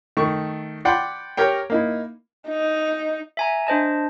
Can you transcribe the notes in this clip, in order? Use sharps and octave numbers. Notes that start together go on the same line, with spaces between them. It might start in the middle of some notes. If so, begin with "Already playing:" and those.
D#3 A3 A4 C#6
D5 F#5 G5 B5 C6
G4 A#4 C#5 G5
A#3 D#4 E4
D#4
E5 G#5 A#5
D4 C5 D#5 A5